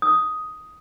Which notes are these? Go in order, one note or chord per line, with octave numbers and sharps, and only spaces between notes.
D#6